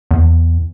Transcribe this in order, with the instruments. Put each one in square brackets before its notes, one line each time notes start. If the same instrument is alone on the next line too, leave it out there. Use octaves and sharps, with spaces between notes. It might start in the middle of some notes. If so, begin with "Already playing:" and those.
[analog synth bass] E2